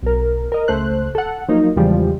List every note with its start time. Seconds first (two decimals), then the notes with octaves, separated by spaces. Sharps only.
0.03 B1 A#4
0.52 A#4 D#5
0.68 C#2 A3 C5 F#6
1.15 A4 F#5
1.48 F3 F#3 A#3 D#4
1.76 E2 C#3 E3 F3 G3 G#3